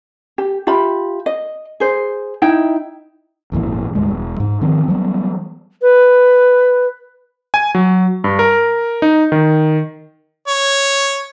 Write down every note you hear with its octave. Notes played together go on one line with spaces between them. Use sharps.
G4
F4 G4 E5 B5
D#5
G#4 C5
D#4 E4 G5
G#1 F2 A#2 E3
D2 G#2 G3 G#3
E1
G#2
D#3 F3 C4 D4
E3 F#3 G3 B3
B4
G#5
F#3
G2
A#4
D#4
D#3
C#5